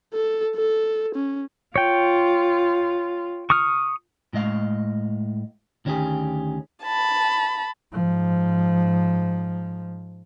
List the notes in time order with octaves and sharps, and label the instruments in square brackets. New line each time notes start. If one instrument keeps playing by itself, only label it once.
[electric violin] A4
A4
C#4
[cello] F4 [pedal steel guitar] C#5 G5
[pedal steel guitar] C#6 D#6 F6
[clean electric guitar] A2 G#3 D#5 F5
D2 D#3 C#4 E4 G4 G#4
[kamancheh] A5 B5
[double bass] G#2 F3